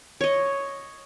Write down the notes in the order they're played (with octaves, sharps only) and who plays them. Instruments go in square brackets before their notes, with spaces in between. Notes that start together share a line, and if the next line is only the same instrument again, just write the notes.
[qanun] C#5 D#5